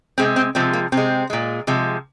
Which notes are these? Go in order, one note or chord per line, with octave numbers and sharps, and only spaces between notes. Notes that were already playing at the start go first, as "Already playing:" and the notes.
C3 G#3 C4
C4
C3 F3 G#3 C4
A#3
C3 G#3 C4
A#2 G#3
C3 F3 G#3